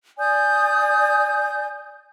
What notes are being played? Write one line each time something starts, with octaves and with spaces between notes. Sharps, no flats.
D5 G#5 D#6 G6